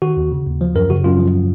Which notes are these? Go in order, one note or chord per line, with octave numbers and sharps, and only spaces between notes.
D#3 F#4
D#2
C#3
D#2
F3
F#2 A#4
C#3 F#4
F#2 F4
F3